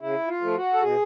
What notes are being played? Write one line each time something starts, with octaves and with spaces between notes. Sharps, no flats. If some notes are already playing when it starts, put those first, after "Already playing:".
C#3 E4
F4
F3 A3
F#4
A4
B2 G#4